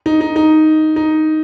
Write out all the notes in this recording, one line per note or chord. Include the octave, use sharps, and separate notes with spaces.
D#4
D#4
D#4
D#4